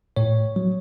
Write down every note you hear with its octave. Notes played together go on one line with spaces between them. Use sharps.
A2 C#5
F#3